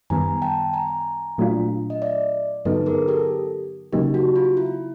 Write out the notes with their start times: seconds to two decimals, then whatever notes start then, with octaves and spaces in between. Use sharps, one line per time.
0.10 F#2 D#3 G3 B3 G#5 A#5
0.42 G5 A5
0.73 G#5 A#5
1.38 A#2 F#3 A3 D4 F4
1.90 D#5
2.02 D5 E5
2.65 G2 D3 F#3 B3 D#4 A4 B4
2.86 G#4 A#4
3.08 G4 A4
3.93 C#3 F#3 A#3 D#4 G4
4.14 F#4
4.36 F4
4.57 E4